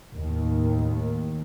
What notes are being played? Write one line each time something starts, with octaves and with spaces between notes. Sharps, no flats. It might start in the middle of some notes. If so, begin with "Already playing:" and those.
D#2 A2 D#3